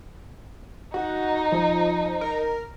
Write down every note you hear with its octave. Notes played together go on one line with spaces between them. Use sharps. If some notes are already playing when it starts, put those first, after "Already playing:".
D#4 F#4
F3
A#4